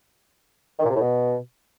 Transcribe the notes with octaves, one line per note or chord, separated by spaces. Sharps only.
D#3
A#2
C3
A2
B2